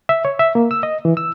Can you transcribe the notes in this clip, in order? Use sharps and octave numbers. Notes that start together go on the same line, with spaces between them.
E5
C#5
E5
A#3
E6
D#5
E3
E6